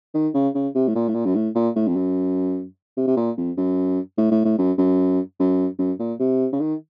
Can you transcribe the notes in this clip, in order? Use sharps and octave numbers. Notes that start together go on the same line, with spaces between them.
D#3
C#3
C#3
C3
A2
A#2
A2
A#2
F#2
A2
A#2
A2
F2
F#2
C3
C3
A#2
F2
F#2
A2
A2
A2
F#2
F#2
F#2
F#2
A#2
C3
C#3
D#3